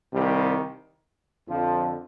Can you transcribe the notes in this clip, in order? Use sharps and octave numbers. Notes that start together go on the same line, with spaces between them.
C2 C3 D#3 G3
F2 D3 F3